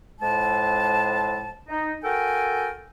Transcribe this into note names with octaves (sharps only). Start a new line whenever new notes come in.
F2 A2 G#3 A5
D#4
F#4 A4 A#4 G5 G#5